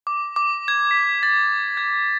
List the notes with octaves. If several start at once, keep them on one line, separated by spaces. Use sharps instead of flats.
D6
D6
G#6
B6
A6
G#6